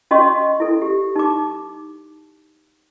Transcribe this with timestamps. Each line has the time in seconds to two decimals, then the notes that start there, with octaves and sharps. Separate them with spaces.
0.11 C#4 F#4 D#5 F5 C6 C#6
0.60 E4 A4
0.82 G4
1.16 D#4 D6